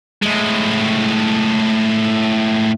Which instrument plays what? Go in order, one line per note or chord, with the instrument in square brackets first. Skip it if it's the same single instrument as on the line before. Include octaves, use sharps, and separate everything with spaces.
[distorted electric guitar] A2 G#3